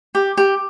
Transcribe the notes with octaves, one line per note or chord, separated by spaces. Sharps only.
G4
G4